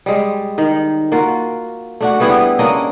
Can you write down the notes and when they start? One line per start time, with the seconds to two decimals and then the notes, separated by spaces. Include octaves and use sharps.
0.06 G3 G#3
0.58 D#3
1.12 A#3 F4 F#4
2.00 A3 D4 F#4
2.20 G3 B3 E4 G#4
2.59 A#3 C#4 D4 D#5